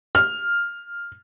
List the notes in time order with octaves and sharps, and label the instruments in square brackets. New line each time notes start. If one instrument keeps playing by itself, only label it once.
[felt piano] F6